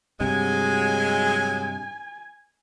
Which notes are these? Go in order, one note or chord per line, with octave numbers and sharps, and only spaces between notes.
G2 C3 F#3 G#3 G#5